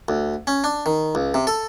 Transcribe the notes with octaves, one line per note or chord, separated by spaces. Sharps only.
D2
C#4
D4
D#3
C#2
C3
A4